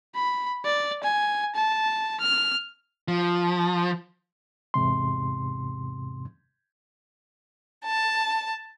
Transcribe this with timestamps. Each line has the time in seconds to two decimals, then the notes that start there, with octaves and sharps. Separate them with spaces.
0.16 B5
0.65 D5
1.04 G#5
1.55 A5
2.20 F6
3.08 F3
4.74 E2 G#2 C3 C6
7.85 A5